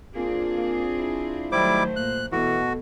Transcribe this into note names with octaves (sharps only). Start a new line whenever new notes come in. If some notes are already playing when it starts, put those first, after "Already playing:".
A#3 C4 D4 F4 G#4
A#3
E4
D#3 F#3 G3 A3 E4 C5 D6
A#2 F#6
B2 E3 F#4 A4